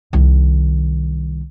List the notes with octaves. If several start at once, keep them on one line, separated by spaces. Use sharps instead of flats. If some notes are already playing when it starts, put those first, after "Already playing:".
C2 D#3